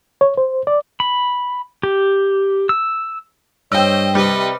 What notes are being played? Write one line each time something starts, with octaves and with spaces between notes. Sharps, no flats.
C#5
C5
D5
B5
G4
E6
G2 C5 C#5 D#5 G5 E6
C3 G3 B4 D#5